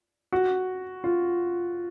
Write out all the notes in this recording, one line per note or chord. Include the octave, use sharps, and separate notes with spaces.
F#4
F4